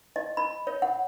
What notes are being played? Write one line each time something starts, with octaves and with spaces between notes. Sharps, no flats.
D#5
B5
C#5
F#5